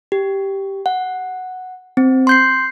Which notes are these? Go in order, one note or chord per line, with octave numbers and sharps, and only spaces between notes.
G4
F#5
C4
C6 G6 C7